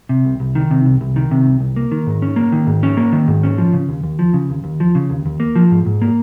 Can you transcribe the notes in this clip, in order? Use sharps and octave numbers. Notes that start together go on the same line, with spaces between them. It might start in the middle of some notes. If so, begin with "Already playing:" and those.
C3
C2
C2
D#3
C3
C2
C2
D#3
C3
C2
C2
A#3
D#3
G#2
C#4
A#3
D#3
G#2
C#4
A#3
D#3
G#2
C#4
F3
C#3
D#2
D#2
F3
C#3
D#2
D#2
F3
C#3
D#2
D#2
A#3
F3
G#2
G#2
A#3